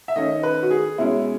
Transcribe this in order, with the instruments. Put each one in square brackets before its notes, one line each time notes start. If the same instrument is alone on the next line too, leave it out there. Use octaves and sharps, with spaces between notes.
[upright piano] E5
D#3 A3 C#4 D#5
B4
F#4
G#4
B2 G#3 C#4 E4